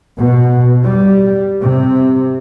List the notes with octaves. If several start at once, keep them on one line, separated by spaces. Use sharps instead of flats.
B2
G3
C3